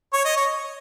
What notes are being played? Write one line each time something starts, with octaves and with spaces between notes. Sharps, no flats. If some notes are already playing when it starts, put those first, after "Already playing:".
C#5
D#5
C#5